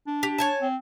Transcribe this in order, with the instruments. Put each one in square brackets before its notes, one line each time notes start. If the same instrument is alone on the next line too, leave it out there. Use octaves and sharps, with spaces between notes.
[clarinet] D4
[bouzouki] G4
C#5 G#5 A5
[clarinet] C4